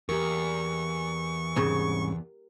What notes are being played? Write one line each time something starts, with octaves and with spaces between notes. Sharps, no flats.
E2 G4 A#4 C#6
C2 G#2 C#3